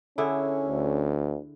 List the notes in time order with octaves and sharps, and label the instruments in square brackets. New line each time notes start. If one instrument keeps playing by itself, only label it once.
[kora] D3 E4 G#4 [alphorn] C#4
[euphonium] D2